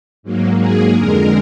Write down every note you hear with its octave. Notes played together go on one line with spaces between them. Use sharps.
G#2 F#3 A#3
G#4
F2 D3 G#3 A#4